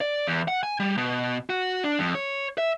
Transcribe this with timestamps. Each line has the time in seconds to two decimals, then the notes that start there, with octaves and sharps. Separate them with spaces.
0.01 D5
0.27 E2
0.48 F#5
0.63 G#5
0.80 G3
0.98 B2
1.50 F#4
1.84 D4
1.99 F2
2.15 C#5
2.58 E5